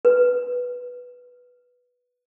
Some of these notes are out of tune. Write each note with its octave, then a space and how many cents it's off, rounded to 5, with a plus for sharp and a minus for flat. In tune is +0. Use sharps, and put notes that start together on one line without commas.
B4 -5